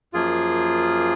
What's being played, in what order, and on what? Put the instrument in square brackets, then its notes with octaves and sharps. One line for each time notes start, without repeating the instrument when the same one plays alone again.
[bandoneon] F#2 F3 A#3 F4 G#4